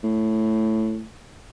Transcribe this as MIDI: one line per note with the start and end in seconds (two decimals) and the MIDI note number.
0.04 1.05 45